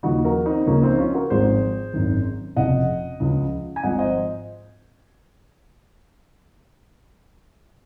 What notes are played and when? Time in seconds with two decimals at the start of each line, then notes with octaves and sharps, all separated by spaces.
0.03 D#2 C#3 F3 D#4 F#4
0.24 F#4 A#4
0.46 C4 D#4
0.66 C#2 C#3 F3 A#3 C#4
0.82 C4 D#4
0.98 C#4 F4
1.14 F#4 A#4
1.30 G#1 G#2 F3 G#4 C5
1.93 G#1 F#2 D#3
2.56 F1 F2 C#3 D#5 F#5
3.20 C#2 C#3 F3
3.76 G#5
3.83 G#1 G#2 F3 D#5 F#5
3.99 C5 D#5